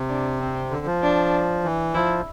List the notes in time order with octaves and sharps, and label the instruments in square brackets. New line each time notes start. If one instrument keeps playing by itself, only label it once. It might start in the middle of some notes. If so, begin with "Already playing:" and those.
Already playing: [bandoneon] C3
[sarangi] D4
C4
[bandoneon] D3
F3
[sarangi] D4
[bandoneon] E3
[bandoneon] F3 [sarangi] E4